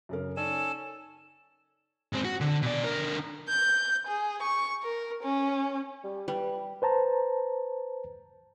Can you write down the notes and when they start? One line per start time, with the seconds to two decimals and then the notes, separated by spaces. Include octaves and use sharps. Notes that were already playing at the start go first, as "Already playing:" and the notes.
0.09 F#2 C#3 A#4
0.37 C#4 D#4 A4 D5 G#5 E7
2.13 G#2 C4
2.25 F#4
2.40 D3
2.62 B2 D5
2.84 D3 A#4
3.49 G6
4.07 G#4
4.43 C#6
4.83 A#4
5.24 C#4
6.04 G3
6.28 G3 B4
6.82 B4 C5 A5 A#5